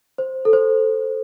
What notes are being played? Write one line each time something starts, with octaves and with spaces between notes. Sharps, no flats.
C5
A4
C5